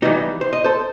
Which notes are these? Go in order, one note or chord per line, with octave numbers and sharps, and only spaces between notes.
E3 G3 B3 D#4 F#4
C5
D#5
A4 C5